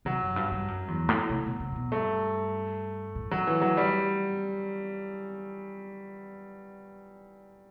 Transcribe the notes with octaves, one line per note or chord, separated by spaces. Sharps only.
C3 F#3
F#2
G2
G2
F#2
E2
A2
C3
B2
C3
C3
B2
G2 A3
A2
F#3
E3
F#3
G3